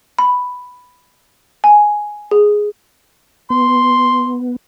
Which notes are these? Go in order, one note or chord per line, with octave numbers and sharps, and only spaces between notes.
B5
G#5
G#4
B3 C6